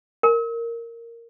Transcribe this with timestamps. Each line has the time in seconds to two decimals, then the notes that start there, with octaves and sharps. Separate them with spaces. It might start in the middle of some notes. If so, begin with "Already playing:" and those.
0.23 A#4